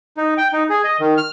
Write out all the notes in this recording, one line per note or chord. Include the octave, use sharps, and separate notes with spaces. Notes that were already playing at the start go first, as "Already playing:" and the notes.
D#4
G5
D#4
G#4
D#5
D#3
F6